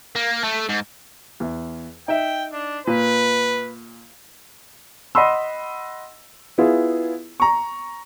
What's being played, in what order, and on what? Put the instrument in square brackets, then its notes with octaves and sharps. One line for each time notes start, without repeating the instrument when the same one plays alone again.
[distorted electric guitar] A#3
A3
G#2
[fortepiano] E2
[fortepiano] D#4 E5 [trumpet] G5
[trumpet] D4
[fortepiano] A#2 [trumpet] B4
[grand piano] D#5 F#5 B5 C6 E6
B3 E4 F4 G#4
A#5 C#6